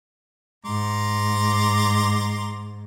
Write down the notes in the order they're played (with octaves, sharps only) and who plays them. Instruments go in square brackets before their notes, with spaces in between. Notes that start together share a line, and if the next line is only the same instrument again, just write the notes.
[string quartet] G#2 [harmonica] A#5 C6 D6